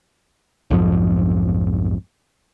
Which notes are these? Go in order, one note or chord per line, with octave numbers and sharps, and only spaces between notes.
B1 F2 G#2 F3